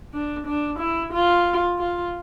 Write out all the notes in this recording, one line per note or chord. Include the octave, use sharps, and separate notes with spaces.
D4
D4
E4
F4
F4